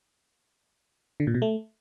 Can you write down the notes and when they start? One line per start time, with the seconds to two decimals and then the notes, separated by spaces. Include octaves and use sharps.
1.20 D3
1.27 A#2
1.34 B2
1.42 A3